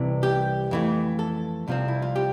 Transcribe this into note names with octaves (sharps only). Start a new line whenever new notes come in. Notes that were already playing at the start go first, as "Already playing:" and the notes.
Already playing: C2 C3 E3
G4
F2 E3 A3
A4
C2 C3 F3 C4
E4
F4
G4